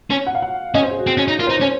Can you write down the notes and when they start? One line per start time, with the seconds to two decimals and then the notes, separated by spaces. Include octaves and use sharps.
0.10 C#4 C#5
0.27 F#5
0.35 F5
0.42 F#5
0.75 C#4 D#5
0.83 C5
0.91 G#4
0.99 F#4
1.07 C4
1.17 C#4
1.28 D#4
1.39 F4 A#4
1.47 C5
1.49 D#4
1.55 C#5
1.61 C#4 C5